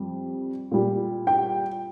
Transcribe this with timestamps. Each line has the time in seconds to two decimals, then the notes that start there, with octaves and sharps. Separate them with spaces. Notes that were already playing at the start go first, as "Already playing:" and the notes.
Already playing: F2 G3
0.71 A#2 G3
1.27 G5